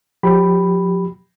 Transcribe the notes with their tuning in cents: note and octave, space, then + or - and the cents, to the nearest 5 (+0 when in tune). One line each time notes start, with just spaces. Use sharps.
F3 +40 G4 +0 B5 +0